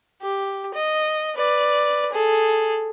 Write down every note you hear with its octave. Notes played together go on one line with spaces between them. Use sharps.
G4
D#5
B4 D5
G#4 A4